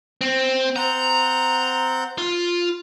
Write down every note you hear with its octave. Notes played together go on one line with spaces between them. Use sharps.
C4
C4 F#5 A#5 G6
F4